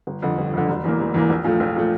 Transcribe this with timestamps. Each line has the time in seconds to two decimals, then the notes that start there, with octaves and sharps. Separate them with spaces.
0.07 G1
0.22 F2 D3
0.38 G1
0.53 F2 D3
0.68 E1
0.84 E2 E3 A#3
1.00 E1
1.14 E2 E3 A#3
1.30 A#1
1.44 A#2 F3 A3
1.60 A#1
1.76 A#2 F3 A3